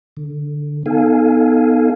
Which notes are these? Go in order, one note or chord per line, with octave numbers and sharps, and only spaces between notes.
D3
B3 D#4 A4 F5 G#5